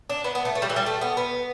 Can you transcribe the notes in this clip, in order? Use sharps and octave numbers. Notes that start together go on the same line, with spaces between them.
D4
B3
B3
A3
A3
G3
E3
G3
A3
B3
B3